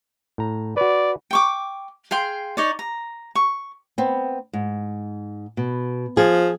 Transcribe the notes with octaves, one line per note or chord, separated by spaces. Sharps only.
A2 A#5
F#4 B4 D5
G5 C#6 D6
G#4 F5 G5 C6
D#4 C#5 D5
A#5
C#6
B3 C4
G#2
B2
F3 G#4